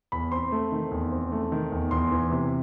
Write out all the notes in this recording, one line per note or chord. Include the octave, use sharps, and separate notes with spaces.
E2 B5
C4 C6
A3
D#3
E2
C4
A3
D#3
E2
E2 C6
E3
C3